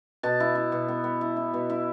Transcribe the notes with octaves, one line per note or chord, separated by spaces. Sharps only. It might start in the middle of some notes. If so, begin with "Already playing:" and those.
B2 A5
E4
E4
B2
B3
B3
E4
E4
B2
E4